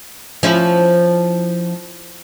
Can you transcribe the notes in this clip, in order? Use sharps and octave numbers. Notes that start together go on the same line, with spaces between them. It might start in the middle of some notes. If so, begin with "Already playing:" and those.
F3 C#4 E4